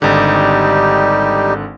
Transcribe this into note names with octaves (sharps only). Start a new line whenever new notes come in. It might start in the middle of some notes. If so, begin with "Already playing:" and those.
G#1 D3 G3 D#4 G4